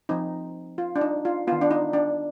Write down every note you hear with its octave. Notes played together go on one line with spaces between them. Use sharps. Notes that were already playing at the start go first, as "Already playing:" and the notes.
F3 C4 D#4
F4
D4
D#4
F4
D#3 B3 F4
D4
D#4
D4